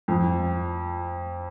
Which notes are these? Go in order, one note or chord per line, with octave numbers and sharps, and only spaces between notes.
F2